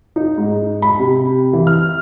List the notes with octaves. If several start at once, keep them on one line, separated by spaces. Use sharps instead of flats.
D#4
G#2
B5
C3
E3
F6